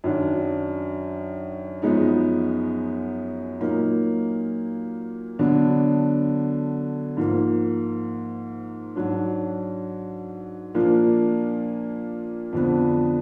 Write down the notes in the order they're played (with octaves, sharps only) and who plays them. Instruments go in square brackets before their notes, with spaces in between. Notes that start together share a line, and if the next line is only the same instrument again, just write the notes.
[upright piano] F#2 D#3 F#3 D4
F#2 F3 G#3 B3 D#4
A#2 F#3 A#3 D#4
D3 F#3 B3 D4
G#2 F3 A#3
G#2 F#3 D4
A#2 F3 A#3 D4
F2 D3 F3 B3 D4